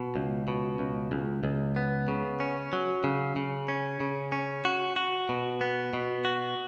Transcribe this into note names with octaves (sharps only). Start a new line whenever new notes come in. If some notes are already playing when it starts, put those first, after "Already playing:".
Already playing: B2
C#2
B2
C#2
C#2
C#2
B3
C#3
C#4
F#3
C#3
C#3
C#4
C#3
C#4
F#4
F#4
B2
B3
B2
F#4